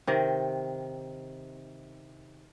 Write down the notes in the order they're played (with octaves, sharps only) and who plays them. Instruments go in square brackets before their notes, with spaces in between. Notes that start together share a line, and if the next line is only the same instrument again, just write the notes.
[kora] C3 D#3